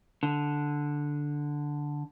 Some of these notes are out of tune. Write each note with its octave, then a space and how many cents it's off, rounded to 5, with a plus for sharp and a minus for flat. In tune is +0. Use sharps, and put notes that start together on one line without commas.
D3 +0